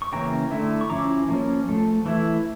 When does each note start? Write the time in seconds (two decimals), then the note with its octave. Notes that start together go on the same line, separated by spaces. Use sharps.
0.02 C#6
0.12 C#3 E3 A#3 C#4 G5 A#5
0.51 D3 A3 E4
0.81 C#6
0.90 F3 C#4 E4 A#5 D6
1.29 F3 A#3 C#4
1.69 F3 A3
2.06 E3 A3 E4